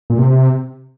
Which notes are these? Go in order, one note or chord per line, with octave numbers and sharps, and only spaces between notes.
A#2
C3